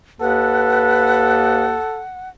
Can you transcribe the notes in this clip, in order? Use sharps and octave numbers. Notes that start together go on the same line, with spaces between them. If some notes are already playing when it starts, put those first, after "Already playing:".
D#2 A4 B4 F#5